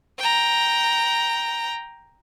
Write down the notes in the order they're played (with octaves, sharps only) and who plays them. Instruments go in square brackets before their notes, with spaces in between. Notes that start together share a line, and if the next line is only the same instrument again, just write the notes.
[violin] G5 A#5